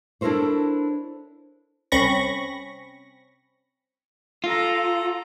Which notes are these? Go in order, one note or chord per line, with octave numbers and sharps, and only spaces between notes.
D4 E4 A4 A#4 C5 C#5
C2 C4 C#4 B5 C#6 A#6
F4 A4 A#5